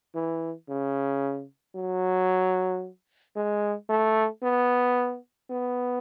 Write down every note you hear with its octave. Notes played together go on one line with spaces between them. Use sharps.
E3
C#3
F#3
G#3
A3
B3
B3